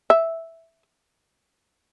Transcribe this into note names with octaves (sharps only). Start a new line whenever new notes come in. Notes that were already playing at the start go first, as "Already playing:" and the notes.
E5